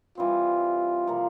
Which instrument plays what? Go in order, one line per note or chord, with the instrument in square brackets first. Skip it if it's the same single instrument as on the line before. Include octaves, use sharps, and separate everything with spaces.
[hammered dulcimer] E3 G3 C4 [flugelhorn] F4
[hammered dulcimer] C3 F3 A#3